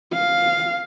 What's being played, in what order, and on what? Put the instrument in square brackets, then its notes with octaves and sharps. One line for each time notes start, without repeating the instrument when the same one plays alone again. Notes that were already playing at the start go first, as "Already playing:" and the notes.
[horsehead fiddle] F5